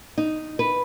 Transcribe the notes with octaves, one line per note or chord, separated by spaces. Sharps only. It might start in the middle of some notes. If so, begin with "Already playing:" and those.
D#4
B4